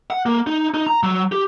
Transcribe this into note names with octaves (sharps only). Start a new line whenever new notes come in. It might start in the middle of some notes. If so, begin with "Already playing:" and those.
F#5
A#3
D#4
D#4
A#5
F#3
G4